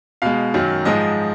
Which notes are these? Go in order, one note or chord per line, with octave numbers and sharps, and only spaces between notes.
B2 G#3 F5
F#2 D#3 F#3
G#2 F3 G#3 D#5